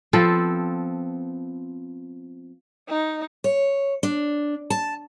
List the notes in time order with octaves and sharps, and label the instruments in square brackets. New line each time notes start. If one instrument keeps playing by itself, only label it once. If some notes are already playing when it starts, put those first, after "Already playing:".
[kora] F3 B3 C4 A4
[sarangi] D#4
[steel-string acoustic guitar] C#5
D4
A5